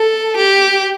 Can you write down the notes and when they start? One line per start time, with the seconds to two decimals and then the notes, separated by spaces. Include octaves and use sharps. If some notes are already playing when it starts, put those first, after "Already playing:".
Already playing: A4
0.37 G4